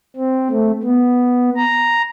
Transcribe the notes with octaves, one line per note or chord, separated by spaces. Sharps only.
C4
A3
B3
A#5